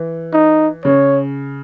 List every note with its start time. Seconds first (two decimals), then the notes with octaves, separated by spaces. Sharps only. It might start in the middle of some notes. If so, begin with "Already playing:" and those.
Already playing: E3
0.33 D#4
0.85 C#3 C#5